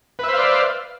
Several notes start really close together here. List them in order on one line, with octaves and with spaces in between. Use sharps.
B4 E5 C5 F5 D5